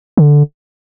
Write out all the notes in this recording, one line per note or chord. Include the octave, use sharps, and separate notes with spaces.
D3